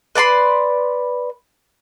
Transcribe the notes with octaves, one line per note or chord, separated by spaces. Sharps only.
B4 D5 B5 C6